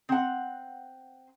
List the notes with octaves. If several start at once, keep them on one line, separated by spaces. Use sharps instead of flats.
C4 F#5